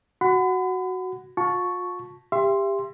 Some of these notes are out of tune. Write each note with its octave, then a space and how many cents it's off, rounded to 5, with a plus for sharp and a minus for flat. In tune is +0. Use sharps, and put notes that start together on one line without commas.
F#4 +0 F#5 +0 B5 +40
F4 +40 A5 +0 C#6 +0
G4 +20 E5 +35 C6 +0